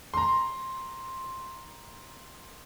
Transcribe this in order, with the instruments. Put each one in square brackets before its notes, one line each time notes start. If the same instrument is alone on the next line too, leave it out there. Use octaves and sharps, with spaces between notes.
[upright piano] A#5 C6